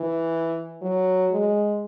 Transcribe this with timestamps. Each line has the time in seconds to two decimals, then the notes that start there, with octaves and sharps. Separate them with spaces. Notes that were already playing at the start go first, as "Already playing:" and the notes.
Already playing: E3
0.82 F#3
1.31 G#3